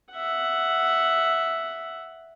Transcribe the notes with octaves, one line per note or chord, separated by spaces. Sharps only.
E5 F#5